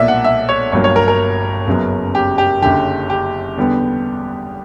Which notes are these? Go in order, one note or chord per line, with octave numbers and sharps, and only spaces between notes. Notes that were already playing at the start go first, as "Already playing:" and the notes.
Already playing: B1 A#2 A#3 D5 E5
F#5
E5
C#5
G1 G2 F#3 A#3 C#5
C#5
A#4
A#4
F#1 F#2 C#3 F#3 B3
G4
G4
F#1 F#2 D3 G4
G4
E2 D3 G3 B3